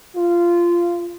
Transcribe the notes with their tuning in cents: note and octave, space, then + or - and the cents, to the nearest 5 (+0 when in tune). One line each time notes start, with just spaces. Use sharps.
F4 -15